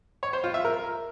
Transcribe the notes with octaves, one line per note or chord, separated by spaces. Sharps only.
C#5
C5
F4
E5
A#4